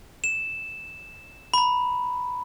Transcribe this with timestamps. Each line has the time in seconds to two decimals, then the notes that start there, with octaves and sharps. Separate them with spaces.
0.24 E7
1.54 A#5 B5